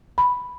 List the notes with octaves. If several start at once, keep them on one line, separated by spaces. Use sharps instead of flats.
B5